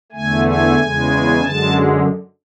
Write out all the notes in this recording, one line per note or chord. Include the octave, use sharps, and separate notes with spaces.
E2 D3 A3 G#5
G#5
E2 C#3 G#3
F#2 D3 G#3 A5